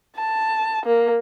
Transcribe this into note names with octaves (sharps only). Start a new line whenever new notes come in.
A5
A#3